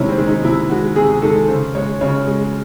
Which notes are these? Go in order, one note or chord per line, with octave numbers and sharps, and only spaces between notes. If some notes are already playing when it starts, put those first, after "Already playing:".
Already playing: C3 D#3 G#3 C#4 E4
C4
D#3 G#3
D#4
C3 E4
D#3 G#3 F#4
C3 G#4
D#3 G#3 A4
C#3 C5
G#3 C#5
C#3 C#5
G#3